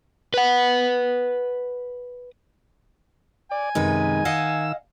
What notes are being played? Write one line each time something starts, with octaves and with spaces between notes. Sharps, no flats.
B4 F#5
D5 G#5
F#2 C3 D#3 G#3 D#4 B4
D#3 D#5 F5 F#5 E6